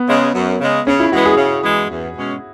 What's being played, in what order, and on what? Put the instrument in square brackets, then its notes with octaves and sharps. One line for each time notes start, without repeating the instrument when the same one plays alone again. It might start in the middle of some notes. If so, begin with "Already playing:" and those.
Already playing: [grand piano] B3
[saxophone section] C#3 G#3
F#2
C#3 G#3
[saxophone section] C#3 [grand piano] C#4
[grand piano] E4
[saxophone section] E3 G#3 B3 [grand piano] F#4
[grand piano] G#4
[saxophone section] C#3
E3 G#3 B3
E2
B2 G#3 C#4